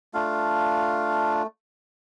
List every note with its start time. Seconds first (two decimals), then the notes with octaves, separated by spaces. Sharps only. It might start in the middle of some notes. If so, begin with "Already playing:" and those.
0.14 A3 D4 F4 F5